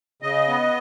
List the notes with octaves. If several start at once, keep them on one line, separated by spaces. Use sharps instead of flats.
C#3 D#5
B3